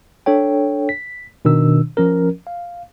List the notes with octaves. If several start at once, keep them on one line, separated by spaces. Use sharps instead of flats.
D4 A4 C#5 G5
B6
B2 D#3 D4 E6
F3 C#4 A#4
F5